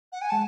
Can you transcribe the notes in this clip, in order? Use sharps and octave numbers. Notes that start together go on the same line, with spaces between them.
F#5
G#5
G#3 A5